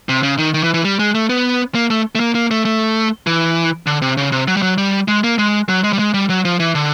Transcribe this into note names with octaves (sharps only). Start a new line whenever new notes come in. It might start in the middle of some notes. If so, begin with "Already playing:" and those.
C3
C#3
D#3
D#3
E3
E3
G3
G#3
A3
B3
A#3
A3
A3
A#3
A#3
A3
A3
E3
D3
C3
C#3
C3
F#3
G3
F#3
G3
G#3
A#3
G#3
F#3
G#3
G3
G#3
G3
F#3
F3
E3
D3